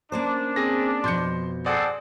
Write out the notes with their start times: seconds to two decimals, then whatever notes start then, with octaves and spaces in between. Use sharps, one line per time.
0.12 A#3 C#4 D4 C5
0.56 C4 G#4 A#6
1.04 F2 B2 C6 G6 C#7
1.66 C4 G#4 A4 D5 F#5